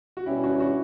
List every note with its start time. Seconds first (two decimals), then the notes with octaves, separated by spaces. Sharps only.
0.17 F#4
0.26 B2 G3 C#4 E4 G4
0.43 D4 F#4
0.60 D4 F#4